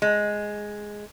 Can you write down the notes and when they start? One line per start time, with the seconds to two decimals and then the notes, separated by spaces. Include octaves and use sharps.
0.02 G#3